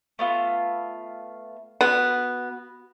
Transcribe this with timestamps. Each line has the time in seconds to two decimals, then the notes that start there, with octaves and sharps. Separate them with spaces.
0.19 A3 B3 F4
1.81 B3 F#4